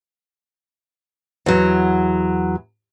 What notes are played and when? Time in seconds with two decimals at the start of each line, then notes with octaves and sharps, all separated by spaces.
1.46 E2 F#3